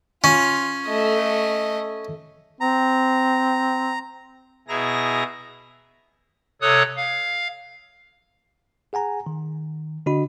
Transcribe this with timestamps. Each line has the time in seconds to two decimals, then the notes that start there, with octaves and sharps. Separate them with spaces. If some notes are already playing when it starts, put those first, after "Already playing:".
0.24 C#4 F4
0.87 A3 D#5
2.61 C4 A#5
4.68 B2 E4 G#4 A#5 A#6
6.62 C3 A4 C#5 D#6 F#6 G#6
6.96 F5
8.93 G#4 F#5 G#5 A#5
9.26 D#3
10.06 D3 D4 F#4 D#5 B5